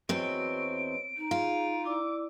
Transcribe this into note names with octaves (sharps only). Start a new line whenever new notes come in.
E2 C4 F#4 B4 C#5 D#5 D7
D#4
F4 G#4
E4 D5 D6 E6